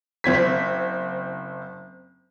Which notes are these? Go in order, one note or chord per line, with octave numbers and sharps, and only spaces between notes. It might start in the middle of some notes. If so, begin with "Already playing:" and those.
F#1 C4 G#6 B6